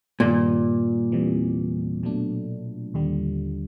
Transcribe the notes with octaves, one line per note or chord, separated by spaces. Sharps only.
G2 A#2 D#3 G3
E2 C3 E3 G3
B2 F#3 A3 D4
D#2 D3 G3